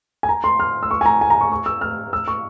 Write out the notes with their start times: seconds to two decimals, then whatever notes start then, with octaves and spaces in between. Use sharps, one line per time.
0.23 G#5
0.29 A#5
0.44 C6
0.60 F6
0.83 E6
0.91 C#6
1.01 G#5
1.06 A#5
1.21 G#5
1.30 A#5
1.41 C#6
1.52 C#6
1.66 E6
1.81 F6
2.13 E6
2.28 C#6